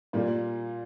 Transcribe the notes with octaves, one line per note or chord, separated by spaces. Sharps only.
A#2 G3 A#3 F4